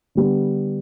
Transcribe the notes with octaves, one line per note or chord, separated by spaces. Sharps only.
D3 G3 B3